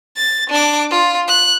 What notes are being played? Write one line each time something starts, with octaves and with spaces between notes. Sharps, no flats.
A6
D4 D6
F4
F#6